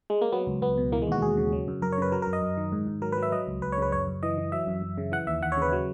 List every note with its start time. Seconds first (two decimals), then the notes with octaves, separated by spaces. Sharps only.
0.10 G#3
0.22 A#3
0.32 F#3 B3
0.47 C#2
0.62 C#2 B3
0.78 B2
0.92 E3 A#3
1.02 G#3
1.07 D#2 F#4
1.22 D#2 G#4
1.37 C#3
1.52 F#3
1.68 F#2
1.82 F#2 A#4
1.92 C#5
1.98 C#3 B4
2.12 F#3 A#4
2.22 A#4
2.27 F#2
2.33 D#5
2.42 F#2
2.57 D#3
2.72 G#2
2.87 G#2
3.02 F#3 A#4
3.12 B4
3.17 F#3
3.23 E5
3.32 F#3 D#5
3.47 C#2
3.62 C#2 B4
3.72 C#5
3.78 C#3 B4
3.92 F#2 C#5
4.07 F#2
4.23 E3 D#5
4.38 E3
4.52 F#3 E5
4.67 F#2
4.82 F#2
4.98 C#3
5.12 E3 F#5
5.27 D#2 E5
5.42 D#2 F#5
5.52 C#5
5.57 C#3 B4
5.72 F#3